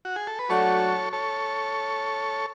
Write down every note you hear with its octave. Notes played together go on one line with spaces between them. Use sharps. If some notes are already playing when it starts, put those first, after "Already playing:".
F#4
G#4
A4
B4
F#3 A3 D4 F#4 A4 C#5
A4 C#5